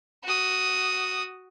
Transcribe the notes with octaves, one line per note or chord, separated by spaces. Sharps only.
F#4 D#6